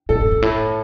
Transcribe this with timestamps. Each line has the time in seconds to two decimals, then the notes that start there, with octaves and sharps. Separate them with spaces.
0.09 A2 A4
0.21 G2
0.31 G2
0.42 A2